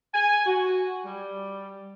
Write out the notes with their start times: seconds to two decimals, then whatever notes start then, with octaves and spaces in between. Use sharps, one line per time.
0.15 G#5
0.46 F#4
1.05 G3